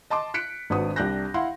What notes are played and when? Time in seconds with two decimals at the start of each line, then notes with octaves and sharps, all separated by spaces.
0.10 D#5 A5 C6 D6
0.34 F#6 B6 C#7 D7
0.70 G#1 D4 F#4 B4 D#6
0.96 C2 D4 G4 F#6 G6 A#6
1.34 E4 F5 F#5 C6